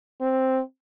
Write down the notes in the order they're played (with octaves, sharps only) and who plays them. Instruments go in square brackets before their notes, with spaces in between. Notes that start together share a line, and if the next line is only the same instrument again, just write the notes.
[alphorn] C4